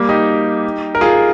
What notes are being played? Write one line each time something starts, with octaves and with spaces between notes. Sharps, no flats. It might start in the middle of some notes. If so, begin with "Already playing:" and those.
Already playing: G3 A#3
D#4 G4
A#4
F4 G#4